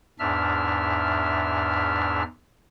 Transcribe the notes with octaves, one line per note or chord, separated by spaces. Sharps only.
E2 G#2 D4 E5 F6